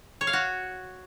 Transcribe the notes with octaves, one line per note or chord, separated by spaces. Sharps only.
C#5
F5
F#4